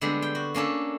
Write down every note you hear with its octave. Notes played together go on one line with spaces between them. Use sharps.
D3 G3 G#3 B3 C4
G5
F#4
A#3 C#4 D4 A4